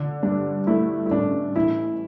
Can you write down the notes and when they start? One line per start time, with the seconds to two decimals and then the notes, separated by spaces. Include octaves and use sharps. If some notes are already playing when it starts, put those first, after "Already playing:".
Already playing: D3
0.23 G2 D4
0.67 A3 E4
1.06 E4
1.11 A1 D4
1.56 E3 E4